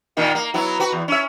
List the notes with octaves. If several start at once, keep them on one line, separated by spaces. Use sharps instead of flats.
A#2 D#3 A#3
A#3
F#3 B3 E4
F#4 B4
E2
C#4 E5